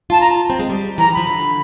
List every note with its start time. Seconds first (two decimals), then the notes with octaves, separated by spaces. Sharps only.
0.10 F4 A5
0.20 A#5
0.50 C4
0.59 G#3
0.70 G3
0.98 E3 A#5
1.09 D#3
1.13 F3 B5
1.27 D3